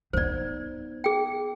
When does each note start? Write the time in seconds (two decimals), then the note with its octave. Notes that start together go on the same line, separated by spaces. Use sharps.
0.13 B3 D#4 C5 D5
1.04 G#4 G5